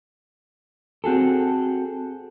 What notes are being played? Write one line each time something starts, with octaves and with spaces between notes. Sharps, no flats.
C4 F#4 G#4 A4